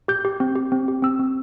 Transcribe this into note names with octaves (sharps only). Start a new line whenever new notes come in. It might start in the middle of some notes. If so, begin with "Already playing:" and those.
G4 G6
G4
C4
G4
C4
G4
C4 E6
C4